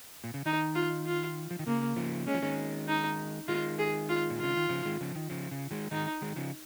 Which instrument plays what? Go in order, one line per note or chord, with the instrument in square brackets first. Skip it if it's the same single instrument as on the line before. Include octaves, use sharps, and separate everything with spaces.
[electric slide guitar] A#2
C#3
[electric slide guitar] D#3 [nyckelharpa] D#4
[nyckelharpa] F4
F4
[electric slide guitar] F3
D#3
[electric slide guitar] C#3 [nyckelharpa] A#3
[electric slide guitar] C#3 F3
[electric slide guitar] G#3 [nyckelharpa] C#4
[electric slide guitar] F3
D#3 G#3
[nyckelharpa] D#4
[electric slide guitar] D#3 G#3 [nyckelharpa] F4
[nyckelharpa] G#4
F4
[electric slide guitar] A#2
[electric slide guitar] C#3 [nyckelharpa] F4
[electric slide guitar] D#3
C#3 F3
D#3 G#3
C#3 F3
D#3
C#3 F3
C#3
D#3 G#3
[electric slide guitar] D#3 G#3 [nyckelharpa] D#4
[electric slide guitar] D#3 G#3
C#3 F3